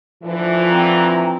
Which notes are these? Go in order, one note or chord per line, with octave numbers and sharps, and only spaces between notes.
A2 D3 E3 F3
C4 A#5